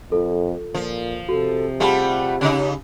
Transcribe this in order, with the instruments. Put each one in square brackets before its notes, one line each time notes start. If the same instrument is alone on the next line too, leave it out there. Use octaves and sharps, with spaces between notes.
[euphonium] F2 [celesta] F4 A4
[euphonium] A#2 [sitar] F3
[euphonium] C3 [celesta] F#4 [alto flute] A4
[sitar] G3 A3 F4 [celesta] G#4 A5 B5 [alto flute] F#5
[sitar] C#3 D#4 [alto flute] G4